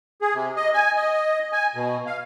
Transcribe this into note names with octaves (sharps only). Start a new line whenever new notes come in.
G#4
C3
D#5
G#5
D#5
G#5
B2
F5